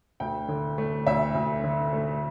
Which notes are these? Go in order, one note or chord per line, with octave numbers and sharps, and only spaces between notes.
D2 G5
D3
A3
D2 E5
D2
D3
A3